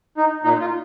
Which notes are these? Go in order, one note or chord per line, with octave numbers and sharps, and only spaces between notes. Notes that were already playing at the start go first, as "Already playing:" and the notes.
D#4
A#2 D#4
F4